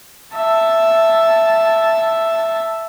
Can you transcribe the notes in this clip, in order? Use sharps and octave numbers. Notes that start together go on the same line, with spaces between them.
E5 A5